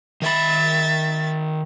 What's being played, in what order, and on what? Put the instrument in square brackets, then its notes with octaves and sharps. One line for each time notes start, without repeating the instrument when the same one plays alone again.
[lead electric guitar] D#3 B5 [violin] E5 A6